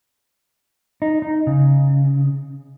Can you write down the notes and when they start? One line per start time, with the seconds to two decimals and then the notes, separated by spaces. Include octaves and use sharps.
1.02 D#4
1.22 D#4
1.47 C#3